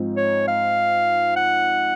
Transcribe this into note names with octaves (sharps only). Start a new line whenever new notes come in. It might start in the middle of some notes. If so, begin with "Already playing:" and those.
Already playing: G#2 F3 C4 D#4
C#5
F5
F#5